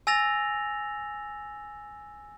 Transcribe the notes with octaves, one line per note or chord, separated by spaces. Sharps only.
G#5 E6 A6 A#6 F7